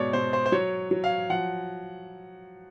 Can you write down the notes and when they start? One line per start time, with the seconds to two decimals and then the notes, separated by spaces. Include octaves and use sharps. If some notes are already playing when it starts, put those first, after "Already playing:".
Already playing: G#2 B2 C#5 D5
0.13 B2 C5
0.33 C5
0.46 C5
0.52 F#3 C#5
0.91 F#3
1.04 F5
1.30 F3 F#5